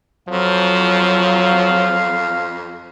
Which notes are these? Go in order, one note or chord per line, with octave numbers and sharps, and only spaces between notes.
F2 F3 F#3 F5